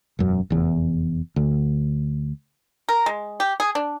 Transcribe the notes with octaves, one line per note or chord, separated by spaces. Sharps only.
E1 F#2
F1 E2
D2
A#4
G#3
G4
G#4
D4